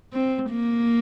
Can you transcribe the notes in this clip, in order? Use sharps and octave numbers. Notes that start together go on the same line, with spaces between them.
C4
A#3